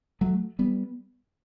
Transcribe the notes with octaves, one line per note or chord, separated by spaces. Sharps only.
F#3 A3
G3 B3